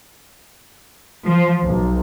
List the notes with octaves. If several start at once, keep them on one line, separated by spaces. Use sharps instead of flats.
F3
B1